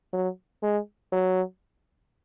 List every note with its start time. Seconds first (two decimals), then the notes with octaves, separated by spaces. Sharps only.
0.13 F#3
0.63 G#3
1.12 F#3